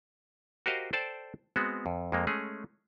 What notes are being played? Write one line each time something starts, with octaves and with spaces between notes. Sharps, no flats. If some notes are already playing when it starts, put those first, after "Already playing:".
F#4 G4 A#4 C5 D#5 F5
A4 C5 D5 G5 A5
G#3 B3 C4 F#4
F2
F2 G#3 A#3
G#3 A3 C#4 G#4